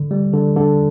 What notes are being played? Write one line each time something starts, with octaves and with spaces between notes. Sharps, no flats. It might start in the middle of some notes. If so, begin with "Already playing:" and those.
Already playing: D3
G3
D3
D3